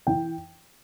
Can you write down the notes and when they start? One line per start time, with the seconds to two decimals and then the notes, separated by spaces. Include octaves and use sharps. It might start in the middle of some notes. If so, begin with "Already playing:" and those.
0.07 E3 G5